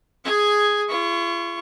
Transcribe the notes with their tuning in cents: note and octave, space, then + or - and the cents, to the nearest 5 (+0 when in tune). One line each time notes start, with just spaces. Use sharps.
G#4 +0 G#5 +0
F4 -45 C#6 +0